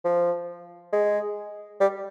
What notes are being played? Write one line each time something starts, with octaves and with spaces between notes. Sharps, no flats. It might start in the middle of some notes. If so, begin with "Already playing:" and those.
F3
G#3
G3